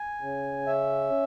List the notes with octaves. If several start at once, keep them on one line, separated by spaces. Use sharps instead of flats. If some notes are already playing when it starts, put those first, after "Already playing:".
Already playing: G#5
C#3
C#4 E5